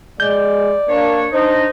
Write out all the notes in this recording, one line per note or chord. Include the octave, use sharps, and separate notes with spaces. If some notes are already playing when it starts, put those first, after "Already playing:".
G#3 D5 G6
A#3 D4 C#5
D4 D#4 C5